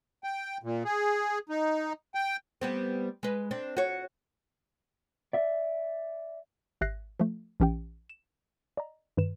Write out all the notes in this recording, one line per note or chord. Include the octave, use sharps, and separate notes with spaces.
G5
A#2
G#4
D#4
G5
G3 B3 C4
G#3 B4
C4 D4
F#4 C#5
D5 E5
G#1 G4 E5 F#6 A#6 C7
F3 A3
A#1 E3 C#4 G4 G5
E7
D5 D#5 A#5
G2 D#3 B4 E7